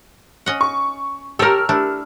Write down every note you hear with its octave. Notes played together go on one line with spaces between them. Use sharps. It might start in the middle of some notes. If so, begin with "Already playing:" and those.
C#4 D#5 F#5
C#6
G4 A4 A#4 C#5 E6 F6
A3 D4 E4